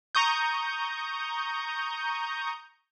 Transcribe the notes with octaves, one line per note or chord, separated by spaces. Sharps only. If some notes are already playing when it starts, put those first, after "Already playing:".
A#5 C#6 D#6 G6